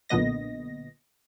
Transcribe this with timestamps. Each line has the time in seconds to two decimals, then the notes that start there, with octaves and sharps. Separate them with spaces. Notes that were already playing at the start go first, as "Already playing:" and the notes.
0.09 B1 A#2 D3 B3 D#5 A#6